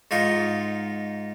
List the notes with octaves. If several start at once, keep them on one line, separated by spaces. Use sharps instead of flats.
G#2 D#4 F4 C#6